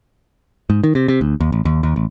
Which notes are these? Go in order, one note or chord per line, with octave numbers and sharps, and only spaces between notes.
G#2
D#3
C3
C3
D2
D#2
A1
D#2
D#2
A1